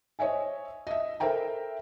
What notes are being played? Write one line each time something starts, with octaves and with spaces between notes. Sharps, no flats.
C5 C#5 D#5 E5 G#5
D#5 E5
A4 A#4 C5 E5 G5 A#5